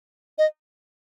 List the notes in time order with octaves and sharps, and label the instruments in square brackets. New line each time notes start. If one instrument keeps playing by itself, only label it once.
[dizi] D#5